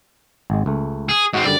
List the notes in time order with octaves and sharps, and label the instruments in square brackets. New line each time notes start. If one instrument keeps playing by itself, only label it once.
[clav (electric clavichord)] G#1 G#3
C#2 A3
[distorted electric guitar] G#4
[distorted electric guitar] G#2 C4 [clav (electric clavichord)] C#4 F#4 D#5
[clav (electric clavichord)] F#2 D3 G3 [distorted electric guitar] D5